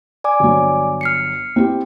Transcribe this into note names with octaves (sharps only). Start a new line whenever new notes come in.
D5 G#5 D6
G1 F#3
F6 C7 C#7
C4 E4 G4